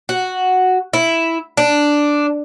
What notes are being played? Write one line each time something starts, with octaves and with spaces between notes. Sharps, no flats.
F#4
E4
D4